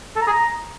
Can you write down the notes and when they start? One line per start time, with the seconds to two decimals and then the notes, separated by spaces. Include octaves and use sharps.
0.16 A4
0.21 A#5
0.27 G#4
0.32 A#5